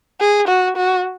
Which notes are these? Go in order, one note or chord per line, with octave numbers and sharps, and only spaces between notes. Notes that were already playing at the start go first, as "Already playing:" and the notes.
G#4
F#4
F#4